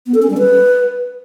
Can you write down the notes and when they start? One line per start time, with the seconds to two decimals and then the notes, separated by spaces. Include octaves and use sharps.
0.07 B3
0.14 A4
0.22 C#4
0.30 G3
0.38 B4